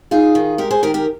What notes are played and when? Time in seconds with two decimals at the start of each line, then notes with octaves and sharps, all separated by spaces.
0.11 D#4 F4 G#4
0.35 D#3
0.58 G#3 G4 A#4
0.71 G#4 C5
0.83 D#3 G4 A#4
0.94 G4 A#4